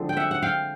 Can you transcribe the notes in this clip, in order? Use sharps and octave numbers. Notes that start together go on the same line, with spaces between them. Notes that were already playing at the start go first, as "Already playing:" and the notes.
Already playing: D3 F3 G#3 C4
G5
E5 F#5
F#5
F5 G5